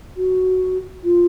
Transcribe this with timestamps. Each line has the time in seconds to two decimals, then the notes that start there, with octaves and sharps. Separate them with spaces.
0.17 F#4
1.04 F4